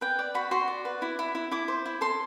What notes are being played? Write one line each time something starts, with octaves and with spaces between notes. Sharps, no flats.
B4 G5
D5
F#4 B5
F#4 C6
D5
B4
E4
E4
E4
E4 D6
C5
E4
A4 C6